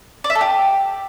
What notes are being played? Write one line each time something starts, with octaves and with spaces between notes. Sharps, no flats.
D5
E5
A4
G4